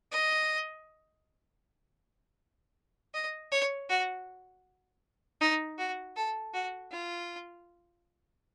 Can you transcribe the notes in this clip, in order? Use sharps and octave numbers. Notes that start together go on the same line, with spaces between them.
D#5
D#5
C#5
F#4
D#4
F#4
A4
F#4
F4